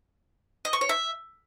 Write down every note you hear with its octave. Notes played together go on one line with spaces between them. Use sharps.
D#5
C#6
C#5
E5